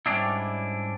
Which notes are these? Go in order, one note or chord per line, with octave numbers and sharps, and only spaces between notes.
G#2 G3 C#4 D4 E4